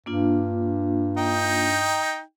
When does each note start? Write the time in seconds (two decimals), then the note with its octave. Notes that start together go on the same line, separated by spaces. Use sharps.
0.06 G2 A#3 D4 F4
1.17 D#4 G5